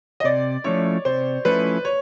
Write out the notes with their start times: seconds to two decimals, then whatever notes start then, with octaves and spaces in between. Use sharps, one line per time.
0.20 D#5
0.24 C3 D5
0.64 F3 A3 C#4 E4 C#5
1.05 C3 C5
1.45 F3 A3 C#4 E4 B4
1.85 C#5